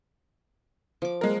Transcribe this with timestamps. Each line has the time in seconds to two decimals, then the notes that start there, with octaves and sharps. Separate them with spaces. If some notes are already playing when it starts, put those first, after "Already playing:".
1.02 F3 D6
1.21 G#3 A#4